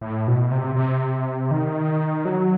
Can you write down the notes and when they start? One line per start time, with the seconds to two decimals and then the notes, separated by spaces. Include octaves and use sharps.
0.01 A2
0.27 B2
0.51 C3
0.76 C3
1.51 D#3
2.25 F#3